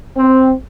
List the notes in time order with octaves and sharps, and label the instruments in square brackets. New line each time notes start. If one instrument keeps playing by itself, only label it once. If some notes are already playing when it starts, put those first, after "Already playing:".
[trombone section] C4